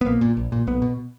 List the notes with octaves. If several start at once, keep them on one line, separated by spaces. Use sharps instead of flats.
B3
A#1 A#3
A#2
A#1
A#2
B1 B3
B2